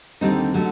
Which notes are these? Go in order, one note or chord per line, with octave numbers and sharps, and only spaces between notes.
D#2 D3 G3 C4 D#4
D3 F#3 A3